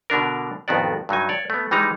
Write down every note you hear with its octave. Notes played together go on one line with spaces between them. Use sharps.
B2 D3 D4 A#4
A1 F2 D#3 B3 F#4 D5
G2 F#3 D#4 G#5
C#5 D5
A3 B3
E3 G3 G#3 D#4 A#5